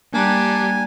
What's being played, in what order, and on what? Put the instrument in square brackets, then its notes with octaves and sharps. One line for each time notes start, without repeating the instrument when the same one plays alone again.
[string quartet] G3 G4 [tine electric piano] A#3 A#5 F#6 [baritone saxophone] D4 [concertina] G#5